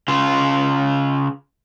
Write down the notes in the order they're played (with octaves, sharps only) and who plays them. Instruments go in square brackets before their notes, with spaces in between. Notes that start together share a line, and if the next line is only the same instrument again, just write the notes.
[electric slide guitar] C#3 F4